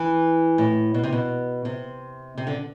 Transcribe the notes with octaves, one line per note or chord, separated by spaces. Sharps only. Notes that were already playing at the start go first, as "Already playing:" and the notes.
Already playing: E3
A2
B2
C3
B2
C3
C3
D3